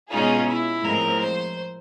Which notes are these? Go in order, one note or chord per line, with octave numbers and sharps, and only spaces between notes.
B2 G#3 C#4 D#4 F4 G#4
E4
A2 F3 G#3 C4 A#4
C5